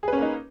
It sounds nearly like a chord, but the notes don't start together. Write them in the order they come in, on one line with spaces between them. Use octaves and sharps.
G#4 B4 C#4 A#3 D#4